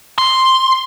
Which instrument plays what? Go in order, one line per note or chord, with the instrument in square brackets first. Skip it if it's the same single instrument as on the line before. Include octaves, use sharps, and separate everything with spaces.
[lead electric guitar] C6